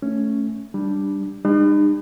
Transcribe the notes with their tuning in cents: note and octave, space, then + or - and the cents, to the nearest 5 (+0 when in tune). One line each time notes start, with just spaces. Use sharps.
A3 +0 C#4 +0
G3 +0 D4 +0
G3 +40 D#4 -45